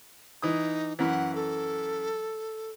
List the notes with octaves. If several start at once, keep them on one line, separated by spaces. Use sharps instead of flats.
E3 D#4 D#6
F#2 E3 F#5
A4